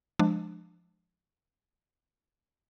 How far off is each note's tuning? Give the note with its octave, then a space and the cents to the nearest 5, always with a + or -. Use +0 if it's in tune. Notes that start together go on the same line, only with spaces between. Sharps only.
F3 +0 G#3 +0 D4 +15